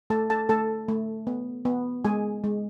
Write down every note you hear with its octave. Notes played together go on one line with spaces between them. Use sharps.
A3 A4 A5
A4 A5
A3 A4 A5
A3
B3
B3
G#3 G#4 G#5
G#3